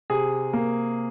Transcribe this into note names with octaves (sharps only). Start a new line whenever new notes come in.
C3 G#4
A#3